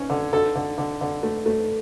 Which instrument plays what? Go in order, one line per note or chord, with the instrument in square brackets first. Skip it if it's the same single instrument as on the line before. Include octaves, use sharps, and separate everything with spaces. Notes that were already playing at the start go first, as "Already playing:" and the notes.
Already playing: [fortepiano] C#4
D3
D3 A4
D3
D3
D3
A3
A3